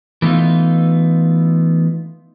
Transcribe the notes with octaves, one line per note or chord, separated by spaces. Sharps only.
E3 A3 B3 D#4 F4